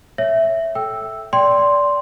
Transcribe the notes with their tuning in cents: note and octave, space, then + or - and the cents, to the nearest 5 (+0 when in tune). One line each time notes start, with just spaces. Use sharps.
C#5 +0 E5 +0
A4 -10 G5 +0 E6 +0
D5 -20 G5 +0 C6 +0